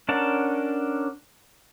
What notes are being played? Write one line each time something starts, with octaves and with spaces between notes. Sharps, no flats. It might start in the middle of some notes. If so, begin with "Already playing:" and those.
C#4 D4 A#4 F#5 A5